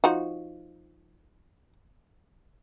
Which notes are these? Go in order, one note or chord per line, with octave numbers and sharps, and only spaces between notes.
F3 D#4 F#4